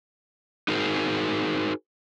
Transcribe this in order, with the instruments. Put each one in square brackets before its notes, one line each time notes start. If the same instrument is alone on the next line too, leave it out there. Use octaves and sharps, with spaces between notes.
[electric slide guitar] D#4 F#4 G#4 A#4 C5